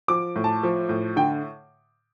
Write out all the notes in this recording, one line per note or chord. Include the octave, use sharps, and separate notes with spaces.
F3 D6
A2
A5
F3
A2
D3 G5